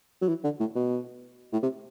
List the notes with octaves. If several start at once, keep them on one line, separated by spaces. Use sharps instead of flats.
F#3
E3
D3
A2
B2
A2
C3